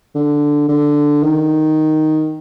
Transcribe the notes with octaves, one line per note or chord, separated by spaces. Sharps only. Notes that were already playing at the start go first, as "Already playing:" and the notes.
D3
D3
D#3